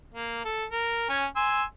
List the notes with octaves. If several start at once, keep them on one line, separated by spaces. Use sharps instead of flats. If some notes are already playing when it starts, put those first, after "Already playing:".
A#3
A4
A#4
C#4 G#5
G#5 C6 E6